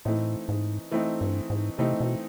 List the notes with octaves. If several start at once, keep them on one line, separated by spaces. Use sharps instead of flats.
A2 E3 A3 C4 D#4
G#2
E3 A3 C4 D#4
G2
G#2
C3 E3 A3 C4 D#4
B2